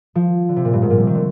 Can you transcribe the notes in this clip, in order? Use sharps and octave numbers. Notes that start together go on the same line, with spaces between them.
F3
D3
C3
A#2
G2
G#2
A#2
C3
D#3
D3